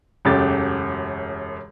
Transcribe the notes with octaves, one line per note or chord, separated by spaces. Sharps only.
E1 F#2 C#3 A3 G4 A6